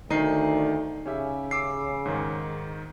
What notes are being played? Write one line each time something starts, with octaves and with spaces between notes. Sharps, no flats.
D2 D#3 D#4 C7 D#7
C#3 C#4 G4 E5
D6 E6 C7
G#2 D#3